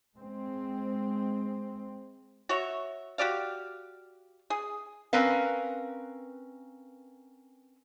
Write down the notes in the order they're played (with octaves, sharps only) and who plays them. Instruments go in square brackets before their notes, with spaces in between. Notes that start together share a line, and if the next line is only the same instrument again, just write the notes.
[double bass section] G#3 C4
[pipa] F#4 C#5 E5
F#4 G4 D5 F5
G#4
[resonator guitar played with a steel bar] C4 C#4 A#4 B4 F5